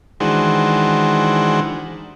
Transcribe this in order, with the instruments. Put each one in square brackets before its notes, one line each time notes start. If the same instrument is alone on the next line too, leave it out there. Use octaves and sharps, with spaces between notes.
[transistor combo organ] D#3 E3 G#3 D4 F#4 C5